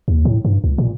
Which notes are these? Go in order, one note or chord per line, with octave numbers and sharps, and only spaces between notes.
D#2
A2
G2
C#2
A#2